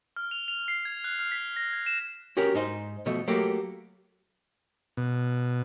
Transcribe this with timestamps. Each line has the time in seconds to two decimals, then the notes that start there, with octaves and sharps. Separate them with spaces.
0.16 F6
0.31 F7
0.48 F7
0.68 C7
0.85 G#6
1.04 F#6
1.19 F6
1.32 B6
1.56 A#6
1.73 G#6
1.86 E7
2.37 C#4 F#4 G4 A#4
2.54 G#2 D#4 C5
3.06 B2 F3 A3
3.27 F#3 A3 A#3 F#4 G4
4.97 B2